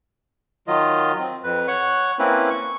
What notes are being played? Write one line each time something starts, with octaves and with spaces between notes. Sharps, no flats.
D#3 F#3 F4 D#5
C4
F2 B4
C#5 F#5 C#6
A#3 C4 C#4 E4 B4
C#6